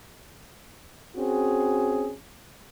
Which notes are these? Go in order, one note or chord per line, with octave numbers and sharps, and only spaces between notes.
C4 C#4 F#4 G#4